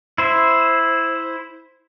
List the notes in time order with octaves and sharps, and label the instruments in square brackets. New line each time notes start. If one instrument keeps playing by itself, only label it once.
[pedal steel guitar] E4 C5